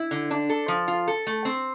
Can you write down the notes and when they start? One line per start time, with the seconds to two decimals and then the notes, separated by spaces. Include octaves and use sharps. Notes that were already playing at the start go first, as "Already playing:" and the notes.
Already playing: E4
0.11 D3
0.31 D4
0.50 A4
0.68 F3
0.88 F4
1.08 A4
1.27 A3
1.45 C4